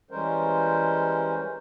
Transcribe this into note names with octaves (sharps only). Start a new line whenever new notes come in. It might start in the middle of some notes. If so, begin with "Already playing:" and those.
E3 G3 G#3 C#4 A#4 C5